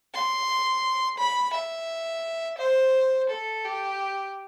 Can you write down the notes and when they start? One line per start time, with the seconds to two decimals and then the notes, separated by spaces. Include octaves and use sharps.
0.14 C6
1.18 B5
1.54 E5
2.58 C5
3.30 A4
3.65 G4